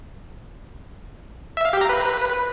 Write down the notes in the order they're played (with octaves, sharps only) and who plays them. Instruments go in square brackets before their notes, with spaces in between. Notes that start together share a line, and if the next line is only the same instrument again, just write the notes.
[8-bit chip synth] E5
F5
G4
A#5
B4